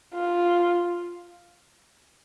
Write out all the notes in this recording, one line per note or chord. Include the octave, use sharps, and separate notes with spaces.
F4